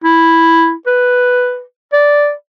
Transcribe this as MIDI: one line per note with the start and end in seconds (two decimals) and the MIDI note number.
0.04 0.73 64
0.87 1.62 71
1.93 2.33 74